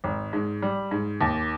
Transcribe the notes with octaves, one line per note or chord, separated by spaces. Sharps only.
G#1
G#2
G3
G#2
D#2